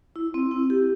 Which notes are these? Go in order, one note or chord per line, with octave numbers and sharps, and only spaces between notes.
E4
C4
E4
G4